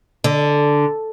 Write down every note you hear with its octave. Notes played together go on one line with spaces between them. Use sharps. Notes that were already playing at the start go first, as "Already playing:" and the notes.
D3